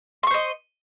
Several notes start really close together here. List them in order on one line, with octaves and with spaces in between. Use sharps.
C6 C#6 C5 D#5